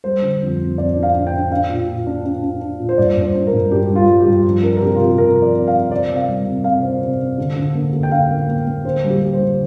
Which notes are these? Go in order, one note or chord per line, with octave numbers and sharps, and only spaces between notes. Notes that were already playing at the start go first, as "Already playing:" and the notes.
G3 C5
D3
F2
F2
F2 D5
D4
F5
D4
G5
D4
D4 F5
A#2
A#2
D4
D4
D4
D4
A#2
C5
G2 D5
G2
C5
D4
A#4
G2
D4 G4
G3
F4
G3
G4
G2
F3
D4 A#4
A#4
C3 G4
F4
C3 G4
C3 A#4
F3
D5
C3
F5
C3
C4 D5
C3
F5
G3
C3
C3 F5
C4
C3
C4
D3
D3
A#3
D3
G5
D3 F5
A#3
A#3
A#3
D3 C5
G3
G4
G3
C5
D3